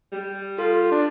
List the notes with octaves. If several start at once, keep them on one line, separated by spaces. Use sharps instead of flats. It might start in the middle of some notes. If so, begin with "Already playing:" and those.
G3
F4 A4
D4